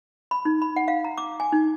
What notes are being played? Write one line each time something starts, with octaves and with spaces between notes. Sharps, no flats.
B5
D#4
B5
F#5
F5
A#5
D6
G#5
D#4